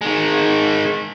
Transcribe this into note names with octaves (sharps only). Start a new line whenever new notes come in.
D#3 G#3